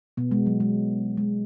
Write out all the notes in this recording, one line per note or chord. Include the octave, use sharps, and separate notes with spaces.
B2 B3
G#3
F#3
G#3
G#3